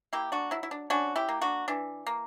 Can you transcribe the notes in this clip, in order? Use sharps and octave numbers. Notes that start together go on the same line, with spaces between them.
A#3 E4 G4
D4 F#4
F#3 E4
E4
D4
C#4 D4 F#4
E4 G4
A#3
D4 F#4
E3 D4
A#3